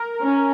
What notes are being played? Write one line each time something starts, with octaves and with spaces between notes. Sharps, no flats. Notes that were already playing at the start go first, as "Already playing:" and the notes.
Already playing: A#4
C#4